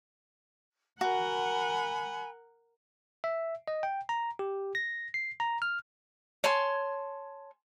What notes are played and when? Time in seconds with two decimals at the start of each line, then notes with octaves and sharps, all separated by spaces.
1.01 F#4 A#4 F#5 G#5 B5
3.24 E5
3.68 D#5
3.83 G5
4.09 A#5
4.39 G4
4.75 A#6
5.14 C7
5.40 A#5
5.62 F6
6.44 C#5 G#5 A5 C6